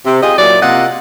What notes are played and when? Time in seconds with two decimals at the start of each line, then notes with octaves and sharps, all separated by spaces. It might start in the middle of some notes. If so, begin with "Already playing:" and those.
0.06 C3
0.22 F4 G4 G#4 D#5
0.39 A#2 F#3 E4 D5
0.61 C3 A#3 F4 D#5 F#5